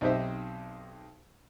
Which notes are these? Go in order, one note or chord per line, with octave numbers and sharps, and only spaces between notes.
B1 C4 D#4 G4 C5 E5